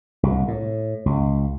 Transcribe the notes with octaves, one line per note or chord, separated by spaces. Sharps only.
C2
A2
C#2